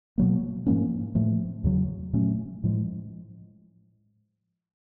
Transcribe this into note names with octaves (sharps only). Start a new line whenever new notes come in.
B2 F#3 A#3
G#2 F3 A#3 C#4
A2 F3 A3
E2 C#3 F#3
A#2 F#3 A3 C#4
A2 F3 G#3